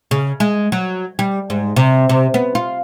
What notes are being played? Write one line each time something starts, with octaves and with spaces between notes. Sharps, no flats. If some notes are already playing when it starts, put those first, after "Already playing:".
C#3
G#3
F#3
G3
G#2
C3
C3
B3
F4